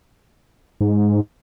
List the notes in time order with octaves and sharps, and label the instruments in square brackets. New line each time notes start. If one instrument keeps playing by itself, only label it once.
[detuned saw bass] G#2